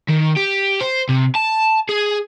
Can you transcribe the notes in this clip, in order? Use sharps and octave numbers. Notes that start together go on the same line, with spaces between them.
D#3
G4
C5
C3
A5
G#4